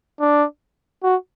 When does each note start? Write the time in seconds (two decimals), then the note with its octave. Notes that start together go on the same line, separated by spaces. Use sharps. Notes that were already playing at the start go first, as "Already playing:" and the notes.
0.21 D4
1.03 F#4